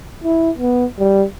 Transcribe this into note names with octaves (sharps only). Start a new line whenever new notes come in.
E4
B3
G3